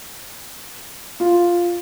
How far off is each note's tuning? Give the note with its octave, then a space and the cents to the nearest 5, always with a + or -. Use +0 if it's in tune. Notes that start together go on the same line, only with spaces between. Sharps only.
F4 +0